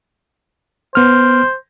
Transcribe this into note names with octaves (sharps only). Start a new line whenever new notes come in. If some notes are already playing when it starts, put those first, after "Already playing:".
B3 C5 F6